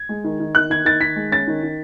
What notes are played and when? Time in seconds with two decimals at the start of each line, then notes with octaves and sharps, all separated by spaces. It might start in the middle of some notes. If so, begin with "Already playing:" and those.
Already playing: G#6
0.09 G#3
0.24 D#3
0.40 D#3
0.55 D#3 F#6
0.70 D#3 G#6
0.85 D#3 A6
1.01 D#3 B6
1.16 G#3
1.31 C#4 A6
1.47 D#3
1.63 D#3